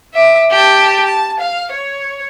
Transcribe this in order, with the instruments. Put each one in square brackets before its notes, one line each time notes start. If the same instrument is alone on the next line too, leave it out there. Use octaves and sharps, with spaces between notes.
[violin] E5 D6
G4 A5
A5
F5
C#5